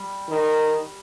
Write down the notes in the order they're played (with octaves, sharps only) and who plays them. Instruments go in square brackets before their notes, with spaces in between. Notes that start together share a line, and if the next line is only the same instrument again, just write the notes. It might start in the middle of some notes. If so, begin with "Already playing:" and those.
Already playing: [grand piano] G3
[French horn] D#3